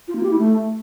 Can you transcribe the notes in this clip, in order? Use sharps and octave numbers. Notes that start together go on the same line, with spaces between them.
F4
A#3
G4
E4
A3